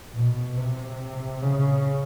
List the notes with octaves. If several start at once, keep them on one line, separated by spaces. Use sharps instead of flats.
B2
C3
C#3